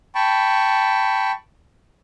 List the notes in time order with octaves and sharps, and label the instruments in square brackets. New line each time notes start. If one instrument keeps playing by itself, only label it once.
[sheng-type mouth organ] G5 A5 B5 C#6